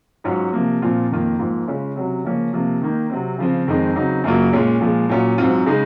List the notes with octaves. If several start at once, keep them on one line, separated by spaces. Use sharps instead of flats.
G#2 F#3 C#4 F4
C3 F3 A#3
A#2 F3 C4 F4
F2 D#3 A#3 F4
G#2 F3 A#3 F4
C#3 G#3 C#4 F4
C3 F#3 C#4
C#3 F3 A#3 C#4
C3 F3 A#3
D#3 A#3 D#4
C3 F#3 C4
C#3 F3 C4
F2 D#3 G#3 C4 D#4
C#3 F#3 C4 D#4
F#2 C#3 F#3 A#3 F4
A#2 G#3 C#4 F4
A#2 F3 G#3
A#2 F#3 C#4 F4
G#2 F#3 C4 F4
C#3 G#3 D#4